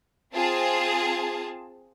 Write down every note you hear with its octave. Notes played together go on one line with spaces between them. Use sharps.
C4 F4 G#4 A5